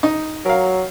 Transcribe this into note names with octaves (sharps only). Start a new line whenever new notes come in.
D#4
F#3 A#4 F5